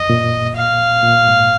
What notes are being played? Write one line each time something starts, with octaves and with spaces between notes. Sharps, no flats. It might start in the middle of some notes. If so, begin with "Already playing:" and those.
Already playing: F#2 D#5
A#2
F5
A#2
G#2